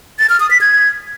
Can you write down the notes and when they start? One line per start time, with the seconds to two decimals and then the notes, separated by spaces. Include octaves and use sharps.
0.19 A6
0.30 F6
0.40 D#6
0.51 B6
0.61 G#6